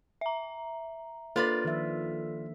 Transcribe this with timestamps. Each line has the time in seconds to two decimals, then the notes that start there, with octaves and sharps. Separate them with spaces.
0.21 E5 A#5
1.36 A#3 D4 F4 A4 B4 D5
1.65 D#3 F3 E5